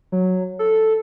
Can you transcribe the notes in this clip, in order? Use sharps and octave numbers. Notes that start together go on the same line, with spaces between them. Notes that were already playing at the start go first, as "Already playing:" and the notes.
F#3
A4